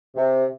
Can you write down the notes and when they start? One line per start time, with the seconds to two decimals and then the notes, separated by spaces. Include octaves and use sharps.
0.17 C3